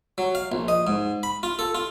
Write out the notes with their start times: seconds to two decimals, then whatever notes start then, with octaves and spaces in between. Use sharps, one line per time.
0.18 F#3
0.35 F5
0.52 A#1
0.68 D#5
0.87 G#2
1.23 B5
1.43 F4
1.59 A4
1.75 F4